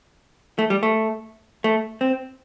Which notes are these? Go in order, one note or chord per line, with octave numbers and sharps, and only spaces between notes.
A3
G3
A3
A3
C4